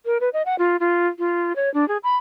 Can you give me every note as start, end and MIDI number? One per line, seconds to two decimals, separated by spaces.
0.05 0.18 70
0.20 0.29 71
0.33 0.42 75
0.46 0.56 78
0.59 0.77 65
0.80 1.07 65
1.19 1.53 65
1.56 1.72 73
1.74 1.87 62
1.88 1.97 68
2.03 2.16 83